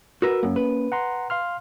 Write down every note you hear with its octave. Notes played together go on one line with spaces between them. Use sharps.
F#4 A#4 B4 E6
F#2 A#3 C#4
B4
F#5 A#5 C6
F5 C6 F6